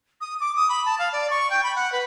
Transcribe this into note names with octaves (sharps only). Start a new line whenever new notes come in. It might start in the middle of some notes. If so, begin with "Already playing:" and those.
D#6
D6
D#6
B5
A5
F5
D5
C#6
G5
B5
F#5
B4